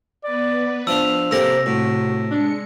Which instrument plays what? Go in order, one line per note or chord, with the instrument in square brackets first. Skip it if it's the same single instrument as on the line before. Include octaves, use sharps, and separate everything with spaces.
[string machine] B3 B4 [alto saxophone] D5
[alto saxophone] F3 [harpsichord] D4 D#5 F5 [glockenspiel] E6
[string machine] C3 [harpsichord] A#3 C4 G4 [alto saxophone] A4 [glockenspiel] E6 A#6
[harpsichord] A2 [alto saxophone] F#4
[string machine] G#3 C#7 [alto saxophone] D4